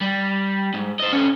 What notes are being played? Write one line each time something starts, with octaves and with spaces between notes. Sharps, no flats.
G3
G#2
C5 D#5
C#4 A4